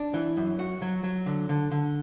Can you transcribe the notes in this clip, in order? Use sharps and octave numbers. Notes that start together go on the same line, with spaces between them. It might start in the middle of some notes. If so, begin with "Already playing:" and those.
Already playing: D4
E3
F#2
F#4
F#3
F#3
D3
D3
D3